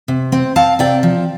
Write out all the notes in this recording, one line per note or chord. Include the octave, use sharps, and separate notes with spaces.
C3
C4
C4 F5 A5
C3 D5 G5
F3